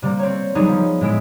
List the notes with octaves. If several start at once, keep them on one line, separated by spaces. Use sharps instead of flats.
C3 G3 A#3
C4 C#5
F#3 G3 B3 D#4 G#4
F3
A2 G#3 E5 D7